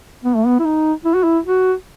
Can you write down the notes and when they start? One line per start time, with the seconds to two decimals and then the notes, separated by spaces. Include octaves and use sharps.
0.25 B3
0.36 A3
0.46 B3
0.60 E4
0.65 D#4
1.05 E4
1.14 F#4
1.23 E4
1.45 F#4